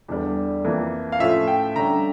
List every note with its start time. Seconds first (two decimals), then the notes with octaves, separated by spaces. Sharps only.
0.08 E2 D3 G3
0.64 F2 E3 A#3
1.12 F5
1.20 A2 F3 C#4 F4 E5
1.48 G5
1.76 D3 G3 C#4 A#5